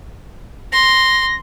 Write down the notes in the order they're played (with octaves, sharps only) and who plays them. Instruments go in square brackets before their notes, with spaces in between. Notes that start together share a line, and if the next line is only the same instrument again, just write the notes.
[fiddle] C6 [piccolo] A#6